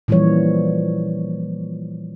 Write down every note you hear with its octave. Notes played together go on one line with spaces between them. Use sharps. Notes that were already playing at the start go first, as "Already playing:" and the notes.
A#2 E3 F3 G3 C#5